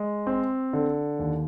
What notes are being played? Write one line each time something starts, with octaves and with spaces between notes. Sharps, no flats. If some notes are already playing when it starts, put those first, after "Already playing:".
Already playing: G#3
C4
D3
D#2